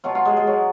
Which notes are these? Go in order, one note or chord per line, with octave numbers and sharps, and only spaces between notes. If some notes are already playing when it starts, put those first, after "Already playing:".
B2 F#3 F4
F4
G#3
G#3
F#3